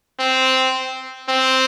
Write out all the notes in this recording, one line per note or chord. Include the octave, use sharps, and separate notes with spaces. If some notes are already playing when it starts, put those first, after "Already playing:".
C4
C4